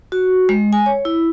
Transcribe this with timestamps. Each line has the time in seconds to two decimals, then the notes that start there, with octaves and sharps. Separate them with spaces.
0.12 F#4
0.49 G#3
0.73 G#5
0.86 C#5
1.05 E4